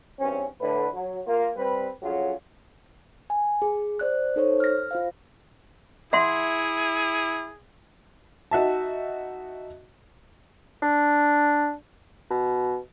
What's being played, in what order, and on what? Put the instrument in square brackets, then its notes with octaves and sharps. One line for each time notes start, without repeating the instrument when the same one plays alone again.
[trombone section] E2 G2 C4 C#4
A2 D3 B4
F#3
A#3 F4
G3 C4 B4
F2 F#3 C#4 F4 F#4 G#4
[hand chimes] G#5
G#4
C5 D5 F#6
D#4 A4 C5 C#5
F6 A#6
F4 C5 F5
[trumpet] E4 [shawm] G#4 [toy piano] E5 F#5 C6
[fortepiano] D#4 F#4 E5 A5
[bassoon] D4
B2